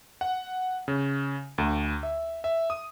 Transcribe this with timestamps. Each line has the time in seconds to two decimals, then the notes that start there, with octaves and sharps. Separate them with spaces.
0.21 F#5
0.88 C#3
1.58 D2
2.03 E5
2.44 E5
2.70 D#6